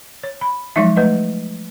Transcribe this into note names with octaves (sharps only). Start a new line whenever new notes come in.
C#5
B5
F3 F#3 G#3 D#4 E5
A3 B4 D#5